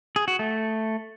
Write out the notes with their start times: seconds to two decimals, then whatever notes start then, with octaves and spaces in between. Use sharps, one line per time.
0.16 G#4
0.28 F#4
0.39 A3